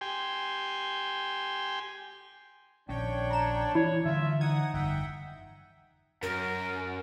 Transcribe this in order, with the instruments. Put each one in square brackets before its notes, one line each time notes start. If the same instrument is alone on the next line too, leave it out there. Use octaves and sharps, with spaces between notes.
[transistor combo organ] G4 G5 G#5 C6
[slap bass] A#1 D#3 C#4 [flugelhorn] D4 [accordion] C#5 G5
[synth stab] A#5 E7
[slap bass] E3 [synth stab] E4 [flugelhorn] C#5
[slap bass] D3 E3 G3 [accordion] F4 [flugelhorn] E5
[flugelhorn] D#4 [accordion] F#5 D#6 [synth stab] G#6
[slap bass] G1 F2 [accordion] E5 F#5 G5
[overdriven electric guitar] F#2 [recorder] A#4